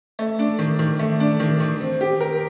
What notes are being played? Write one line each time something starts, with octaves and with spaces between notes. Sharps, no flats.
A3
D4
D#3
D#3
A3
D4
D#3
D#3
C4
G4
A#4